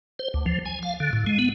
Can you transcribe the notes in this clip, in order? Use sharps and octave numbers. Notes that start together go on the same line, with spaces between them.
C5
D2
F3
G#5
F5
D3
A2
G#3
B3